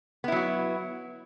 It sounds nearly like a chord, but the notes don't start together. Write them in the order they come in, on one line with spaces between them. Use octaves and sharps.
B3 E4 F#3 F#4